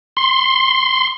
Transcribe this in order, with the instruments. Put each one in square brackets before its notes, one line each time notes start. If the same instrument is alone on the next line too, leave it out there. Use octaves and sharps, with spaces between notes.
[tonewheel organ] C6